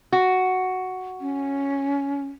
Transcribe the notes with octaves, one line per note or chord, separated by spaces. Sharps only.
F#4
C#4